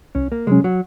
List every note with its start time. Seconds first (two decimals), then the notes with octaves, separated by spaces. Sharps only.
0.15 C2 C#4
0.32 A#3
0.47 C3 F#3 G#3 C#4
0.64 F#3